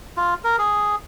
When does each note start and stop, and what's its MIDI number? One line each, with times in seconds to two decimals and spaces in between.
0.17 0.34 65
0.44 0.56 70
0.58 0.96 68